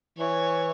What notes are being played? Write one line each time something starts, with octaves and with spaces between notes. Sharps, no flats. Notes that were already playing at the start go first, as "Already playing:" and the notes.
E3 C#5